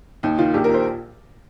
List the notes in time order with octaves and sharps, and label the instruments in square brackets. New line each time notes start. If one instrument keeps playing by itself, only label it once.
[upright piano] D#2 D#4
D#3 F4
A#1 G4
A#2 A#4
C5